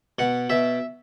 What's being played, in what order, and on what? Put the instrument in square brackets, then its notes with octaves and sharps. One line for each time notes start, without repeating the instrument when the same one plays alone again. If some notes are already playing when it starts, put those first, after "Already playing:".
[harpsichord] B2 F#5
B2 E5